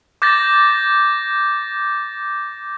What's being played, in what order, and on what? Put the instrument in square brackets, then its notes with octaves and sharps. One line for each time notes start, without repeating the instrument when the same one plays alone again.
[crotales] D6 G6 A6 A#6